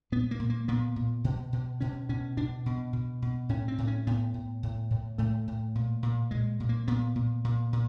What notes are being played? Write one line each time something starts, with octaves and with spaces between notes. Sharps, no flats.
A#2 B3
A#3
A#2
A#3
A#2 B3
A#2
B2
B2
B2 C#4
B2 C#4
B2 D4
B2
B2
B2
A2 C#4
C4
A2
C#4
A2 B3
A2
A2
A2
A2 A3
A2
A#2
A#2
A#2 G#3
A#2
A#3
A#2 B3
A#2
A#2
A#2